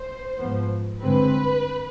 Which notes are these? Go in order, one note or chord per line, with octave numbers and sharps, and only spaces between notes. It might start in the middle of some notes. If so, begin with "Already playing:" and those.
Already playing: C5
G#2 F3 B3
G2 D3 G#3 C4 B4